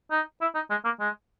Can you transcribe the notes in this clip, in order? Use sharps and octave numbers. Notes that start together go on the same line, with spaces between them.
D#4
E4
D#4
G#3
A#3
G#3